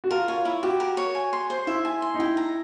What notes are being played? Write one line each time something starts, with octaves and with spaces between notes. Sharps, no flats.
F#4
F4 A#4
F4 C#5
E4
F#4 G4
A#4
C#5
G#5
C6
C5
E4 E5
G#5
C6
D#4
E4 G5
A#5